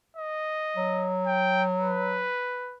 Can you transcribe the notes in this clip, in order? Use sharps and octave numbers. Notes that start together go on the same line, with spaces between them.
D#5
F#3
G5
B4